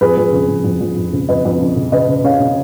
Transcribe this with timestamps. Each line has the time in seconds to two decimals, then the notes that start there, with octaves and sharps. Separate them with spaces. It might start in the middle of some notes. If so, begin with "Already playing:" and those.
0.01 F2 G#4 B4
0.17 F2
0.33 C#3
0.49 F2
0.64 F2
0.81 F2
0.97 F2
1.13 C#3
1.29 F2 B4 D#5
1.45 F2
1.61 C#3
1.76 C#3
1.92 C#3 B4 D#5
2.09 C#3
2.24 C#3 C#5 F5
2.40 C#3